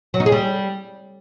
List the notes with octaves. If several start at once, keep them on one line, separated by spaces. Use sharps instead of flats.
F#3
D#4
G#4
G3